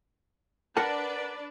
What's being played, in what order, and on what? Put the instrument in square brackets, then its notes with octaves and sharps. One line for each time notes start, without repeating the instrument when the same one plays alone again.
[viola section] D4 B4 D5 [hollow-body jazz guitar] A#4 F#5 A5